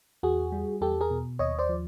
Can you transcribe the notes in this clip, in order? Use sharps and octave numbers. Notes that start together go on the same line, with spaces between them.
E2 F#4 G#4
G3
E2 G4 A4
G#4 A#4
B2
D#2 C#5 D#5
C5 D5
F3